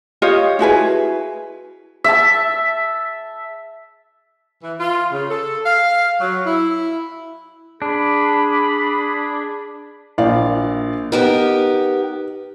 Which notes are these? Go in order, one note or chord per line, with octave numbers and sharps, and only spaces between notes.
F4 G4 C#5 D#5
E4 F#4 G#4 B4
E5 A5
E3
F4
C#3
A4
F5
F#3
E4
D4 G#4 B5
A#1 D5 F5
B3 D#4 G4 A#4